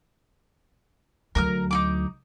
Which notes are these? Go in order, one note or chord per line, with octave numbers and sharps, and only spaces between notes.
D2 F#3 A#4 D#6 F6
D#4 E4 D6